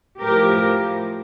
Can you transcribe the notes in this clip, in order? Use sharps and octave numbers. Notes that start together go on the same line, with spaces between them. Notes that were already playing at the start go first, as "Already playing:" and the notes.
A2 F3 G4 A#4